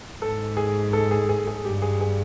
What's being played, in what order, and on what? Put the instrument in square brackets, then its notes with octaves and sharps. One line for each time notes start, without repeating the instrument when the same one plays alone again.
[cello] G#2 [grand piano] A4
[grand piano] G#4
A4
G#4
G#4
G#4
[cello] G2 [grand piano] G4
[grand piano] G#4
G#4